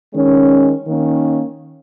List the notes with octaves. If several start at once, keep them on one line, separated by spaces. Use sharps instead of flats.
D#3 G#3 C#4
D#3 A#3 C#4